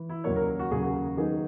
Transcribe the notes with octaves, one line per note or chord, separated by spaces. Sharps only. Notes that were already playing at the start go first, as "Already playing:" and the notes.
Already playing: E3
E4
D#2 C#3 F#3 A#3 C#5
A#4
F#4
D#2 C#3 F#3 A#3 G#4
F#4
D#3 F#3 B3 D#4 G#4